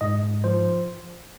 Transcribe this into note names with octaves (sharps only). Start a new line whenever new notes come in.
G#2 D#5
G#2
F3 C5